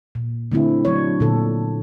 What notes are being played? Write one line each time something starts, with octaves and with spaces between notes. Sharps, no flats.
A#2
D3 A3 C4 E4
F#3 D4 C#5
A#2 D3 A4